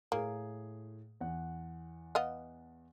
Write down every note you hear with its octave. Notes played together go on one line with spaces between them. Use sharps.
A2 A#3 G#4
E2 F#5
B3 D#5 F5